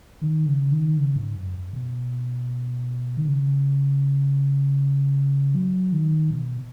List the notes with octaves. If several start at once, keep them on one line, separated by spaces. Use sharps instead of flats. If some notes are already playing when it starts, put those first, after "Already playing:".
D#3
C#3
D#3
C#3
G#2
F#2
B2
D#3
C#3
F#3
D#3
B2